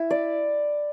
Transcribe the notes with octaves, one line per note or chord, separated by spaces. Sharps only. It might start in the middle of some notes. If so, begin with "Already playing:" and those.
Already playing: E4
D5